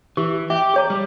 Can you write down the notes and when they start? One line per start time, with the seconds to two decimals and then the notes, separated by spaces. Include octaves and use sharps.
0.17 E3 G4
0.50 G4 E5
0.74 G#4 C#5 A#5
0.90 G3